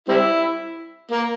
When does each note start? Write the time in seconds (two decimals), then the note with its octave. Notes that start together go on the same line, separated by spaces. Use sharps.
0.09 G3 C4 E4
1.11 A#3